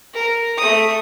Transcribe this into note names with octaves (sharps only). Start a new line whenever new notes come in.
A#4
A3 D#6